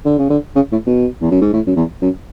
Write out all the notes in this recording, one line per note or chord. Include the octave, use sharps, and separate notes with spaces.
D3
C#3
D3
C#3
A2
B2
E2
F#2
G#2
A2
F#2
E2
F#2